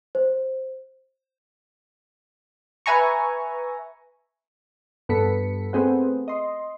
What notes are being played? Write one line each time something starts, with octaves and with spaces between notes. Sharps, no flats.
C5
B4 E5 G#5 A#5 C#6
G2 B3 A4 B6 C#7
A3 B3 C4 G#4 C5 F#5
D#5 C6